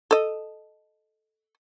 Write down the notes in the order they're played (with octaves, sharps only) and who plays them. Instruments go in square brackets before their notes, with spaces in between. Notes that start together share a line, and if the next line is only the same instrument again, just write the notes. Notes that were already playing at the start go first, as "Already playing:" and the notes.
[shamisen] A4 D#5